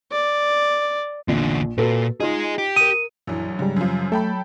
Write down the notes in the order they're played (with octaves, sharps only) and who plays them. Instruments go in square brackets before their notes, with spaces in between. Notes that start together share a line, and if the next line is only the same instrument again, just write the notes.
[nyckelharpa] D5
[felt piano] A#1 [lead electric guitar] E2 D3
[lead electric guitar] A#2 [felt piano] F#4 A4 B4
[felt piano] D#4 F4 [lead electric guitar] G#4 D#5
[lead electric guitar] G4
[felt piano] A#4 D#6 [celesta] D#7
[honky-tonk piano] A#1 E3 [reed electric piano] F#2 [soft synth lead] F#3
[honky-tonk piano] G#2 [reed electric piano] C#3 G3
[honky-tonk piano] F#2 F3
[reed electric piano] A3 [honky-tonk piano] A4 G5 B5